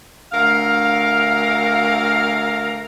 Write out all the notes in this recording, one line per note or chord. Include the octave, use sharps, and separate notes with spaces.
D2 A#4 F5